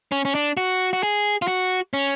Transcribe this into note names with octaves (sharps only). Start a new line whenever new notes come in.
C#4
C#4
D4
F#4
F#4
G#4
F4
F#4
C#4